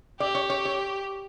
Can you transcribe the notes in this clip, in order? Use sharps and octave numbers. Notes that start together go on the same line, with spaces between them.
G4 D5
C#5
C#5
C#5